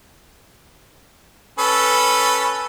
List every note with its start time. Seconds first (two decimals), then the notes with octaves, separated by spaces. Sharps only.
1.59 C#4 A4 B4